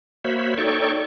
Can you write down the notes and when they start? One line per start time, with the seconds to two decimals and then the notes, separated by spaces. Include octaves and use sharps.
0.24 A#3 F#4 C5 C#5 E5 B5
0.58 D#4 A4 C#5 D5 G5 C#6